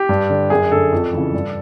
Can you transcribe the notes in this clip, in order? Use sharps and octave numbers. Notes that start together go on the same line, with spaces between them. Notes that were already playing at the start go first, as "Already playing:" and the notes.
Already playing: G4
G2
D3
F#2 G#4
D3 A4
F2
C#3 E3
G2